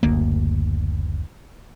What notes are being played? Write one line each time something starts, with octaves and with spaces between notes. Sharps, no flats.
F#1 D2 A#3